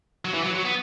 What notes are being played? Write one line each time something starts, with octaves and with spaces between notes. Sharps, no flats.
F#3
E3
F#3
F#3
B3